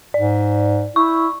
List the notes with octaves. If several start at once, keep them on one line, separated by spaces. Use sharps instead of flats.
G#2 D5
E4 C#6